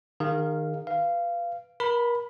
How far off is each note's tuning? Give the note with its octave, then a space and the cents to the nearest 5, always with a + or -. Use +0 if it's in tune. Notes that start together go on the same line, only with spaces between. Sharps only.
D#3 -15 G#4 -40 F5 +0
B4 +0 F5 -15
A#4 +35 B5 +0